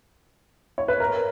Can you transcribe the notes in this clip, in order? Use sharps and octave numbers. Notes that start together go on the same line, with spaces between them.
C#5
B4
A#4